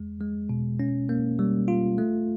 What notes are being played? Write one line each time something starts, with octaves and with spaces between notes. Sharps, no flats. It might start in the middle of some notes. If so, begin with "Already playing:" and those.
Already playing: E2 G#3
G#3
B2
C#4
A#3
G3
F4
A3